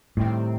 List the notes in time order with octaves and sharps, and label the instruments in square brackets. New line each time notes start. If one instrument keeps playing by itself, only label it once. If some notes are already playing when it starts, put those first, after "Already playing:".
[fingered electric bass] A2 [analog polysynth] C3 D#3 G3 C4